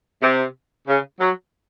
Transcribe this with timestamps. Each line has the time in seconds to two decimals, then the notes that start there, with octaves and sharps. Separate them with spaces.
0.22 C3
0.87 C#3
1.19 F#3